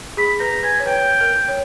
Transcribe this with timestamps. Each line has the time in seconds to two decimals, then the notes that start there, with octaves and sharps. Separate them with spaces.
0.17 G#4 B5
0.40 B4 A#5
0.63 B4 G#5
0.80 C#5
0.86 B4 G5
1.21 A#4
1.48 C#5